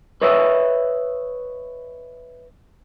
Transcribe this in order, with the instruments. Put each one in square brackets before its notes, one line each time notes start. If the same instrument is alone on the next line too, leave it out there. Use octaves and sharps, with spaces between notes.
[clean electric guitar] B4 C#5 D#5 E5